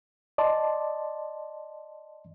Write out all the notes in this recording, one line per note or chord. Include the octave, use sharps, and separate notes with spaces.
D5 D#5 A5 C6